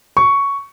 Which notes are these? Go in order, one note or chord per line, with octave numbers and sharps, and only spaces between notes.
C#6